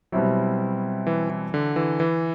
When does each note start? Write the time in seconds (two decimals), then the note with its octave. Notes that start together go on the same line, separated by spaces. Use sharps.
0.12 B2 F#3 G3 C4 E4
1.07 E3
1.30 E3
1.54 D3
1.76 E3
2.00 E3